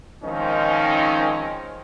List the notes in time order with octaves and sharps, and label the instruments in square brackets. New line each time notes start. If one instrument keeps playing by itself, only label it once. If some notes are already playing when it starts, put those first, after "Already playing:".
[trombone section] D#3 F3 G#3 C4 C#4 D#4